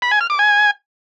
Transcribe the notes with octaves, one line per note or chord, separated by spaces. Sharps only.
B5
G#5
F6
D6
G#5